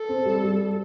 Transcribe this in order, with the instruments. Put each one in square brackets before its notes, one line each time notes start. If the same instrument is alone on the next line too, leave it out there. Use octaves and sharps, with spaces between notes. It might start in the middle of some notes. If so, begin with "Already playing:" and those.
Already playing: [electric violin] A4
[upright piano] C4
G3
G3